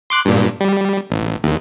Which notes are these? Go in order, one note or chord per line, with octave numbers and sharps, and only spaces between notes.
C6 D6 F#6
G2 A#2
G3
A1
D#2